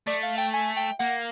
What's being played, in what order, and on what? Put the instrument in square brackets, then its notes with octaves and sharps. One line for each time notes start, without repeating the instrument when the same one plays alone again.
[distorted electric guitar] A3 [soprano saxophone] D5
[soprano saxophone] F5
G5
G#5
G5
[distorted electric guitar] A#3 [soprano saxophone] F#5